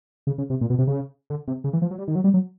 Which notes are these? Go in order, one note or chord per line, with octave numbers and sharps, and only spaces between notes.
C#3
C#3
C3
A#2
B2
C3
C#3
D3
C3
C#3
E3
F3
F#3
G3
D#3
F#3
G3
F#3